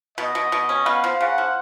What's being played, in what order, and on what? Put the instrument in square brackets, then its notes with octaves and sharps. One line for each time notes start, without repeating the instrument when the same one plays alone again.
[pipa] B2 [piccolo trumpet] D#5
[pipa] B2
B2
C#4
[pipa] B3 [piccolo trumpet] F5
[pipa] F3
[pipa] C#3 [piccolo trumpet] F#5
[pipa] F3